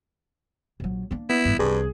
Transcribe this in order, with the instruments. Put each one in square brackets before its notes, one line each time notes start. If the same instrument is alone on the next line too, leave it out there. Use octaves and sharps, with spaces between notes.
[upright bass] A#1 F#3
A#3 D4
[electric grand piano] B3 [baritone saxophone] E4
[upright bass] A1 G2
[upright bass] C2 F3 [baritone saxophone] G2 [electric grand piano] G#4